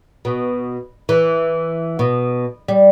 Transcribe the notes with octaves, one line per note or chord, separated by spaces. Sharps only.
B2
E3
B2
G3